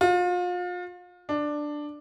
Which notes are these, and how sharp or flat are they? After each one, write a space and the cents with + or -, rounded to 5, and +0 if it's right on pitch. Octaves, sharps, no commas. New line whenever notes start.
F4 +35
D4 +10